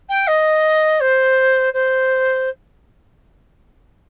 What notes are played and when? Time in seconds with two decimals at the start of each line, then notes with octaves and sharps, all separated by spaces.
0.09 G5
0.27 D#5
1.00 C5
1.74 C5